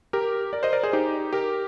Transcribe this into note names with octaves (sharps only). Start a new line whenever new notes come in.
G4 A#4
A#4 D5
C5 D#5
A#4 D5
G#4 C5
D#4 G4
G4 A#4